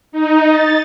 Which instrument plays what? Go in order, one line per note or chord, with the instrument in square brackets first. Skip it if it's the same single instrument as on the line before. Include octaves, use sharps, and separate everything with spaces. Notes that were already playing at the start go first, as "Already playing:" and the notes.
[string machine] D#4
A6